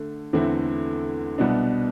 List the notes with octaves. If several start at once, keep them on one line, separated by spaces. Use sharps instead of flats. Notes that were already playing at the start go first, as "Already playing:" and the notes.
Already playing: D3 A3
E2 D3 A3 C4 E4
C2 B2 B3 D4